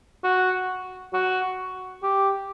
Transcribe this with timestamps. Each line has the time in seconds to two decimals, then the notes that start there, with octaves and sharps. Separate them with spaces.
0.24 F#4
1.13 F#4
2.03 G4